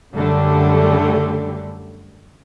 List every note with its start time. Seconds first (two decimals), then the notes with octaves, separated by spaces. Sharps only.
0.13 F#2 D3 G3 A3